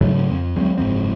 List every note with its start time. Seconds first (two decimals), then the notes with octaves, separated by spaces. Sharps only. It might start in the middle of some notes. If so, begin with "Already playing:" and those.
0.01 G#2 C#3 F#3 A3
0.31 F2
0.56 D2 F#3 G#3 C4
0.78 F#1 G#2 F3 C4